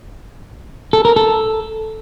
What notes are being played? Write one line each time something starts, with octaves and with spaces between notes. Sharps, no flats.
A4
A#4
A4